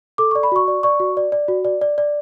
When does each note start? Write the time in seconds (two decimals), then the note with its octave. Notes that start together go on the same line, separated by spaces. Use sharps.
0.18 A4 D6
0.31 D5 C#6
0.43 B5
0.52 F#4 C#6
0.68 D5
0.83 D5 C#6
1.00 F#4
1.17 D5
1.32 D5
1.48 F#4
1.65 D5
1.81 D5
1.98 D5